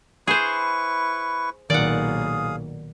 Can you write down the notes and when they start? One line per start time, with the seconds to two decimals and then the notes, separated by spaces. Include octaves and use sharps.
0.27 E4 G#4 B4 C5 C#6
1.70 B1 A#2 D#3 G#4 D5 F5 F#5 D#6